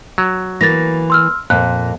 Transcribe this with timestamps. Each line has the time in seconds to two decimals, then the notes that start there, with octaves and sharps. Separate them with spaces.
0.18 F#3
0.61 E3 A#3 A6 A#6
1.10 C6 E6 F6
1.50 F2 A#2 A#3 F#6